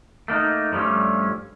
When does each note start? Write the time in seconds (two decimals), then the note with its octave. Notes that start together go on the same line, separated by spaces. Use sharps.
0.28 A3 A#3 D#4
0.72 G2 F3 G3 A3 C#4